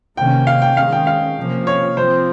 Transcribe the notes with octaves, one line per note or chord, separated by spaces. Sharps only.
C3 D#3 A#3 C#4 G5
F5
G5
D#3 G#3 C#4 F5
G5
F5
C3 F3 A#3 C#4
C#5
F3 C4 C5